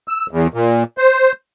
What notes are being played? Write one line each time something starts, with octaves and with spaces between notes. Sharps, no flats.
E6
E2
A#2
C5